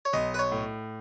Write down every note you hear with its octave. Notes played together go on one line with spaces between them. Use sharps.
C#5
B1 D#5
B4
C#5
A2